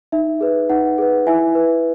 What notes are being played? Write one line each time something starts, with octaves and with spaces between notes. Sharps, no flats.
D#4 E5
G#4 B4
D#4 F#5
G#4 B4
E4 E5 G#5
B4